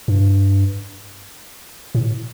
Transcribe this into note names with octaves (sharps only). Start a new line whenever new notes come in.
G2
A2